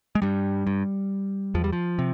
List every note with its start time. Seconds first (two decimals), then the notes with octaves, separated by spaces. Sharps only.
0.15 G#3
0.22 G2 G3
0.67 G2
1.54 E2 F3
1.64 G3
1.73 F3
1.99 C3